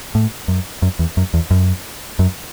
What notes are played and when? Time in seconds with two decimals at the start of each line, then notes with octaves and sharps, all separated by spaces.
0.15 A2
0.48 F#2
0.82 F#2
0.99 E2
1.17 F#2
1.34 E2
1.51 F#2
2.19 F#2